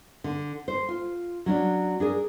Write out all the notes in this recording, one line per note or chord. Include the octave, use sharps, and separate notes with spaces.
D3
C5
F4
F#3 C#4 D4
D4 G#4 A#4